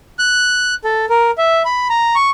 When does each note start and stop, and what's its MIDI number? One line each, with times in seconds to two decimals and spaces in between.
0.19 0.74 90
0.84 1.06 69
1.09 1.31 70
1.38 1.62 76
1.65 1.88 83
1.90 2.15 82
2.15 2.31 85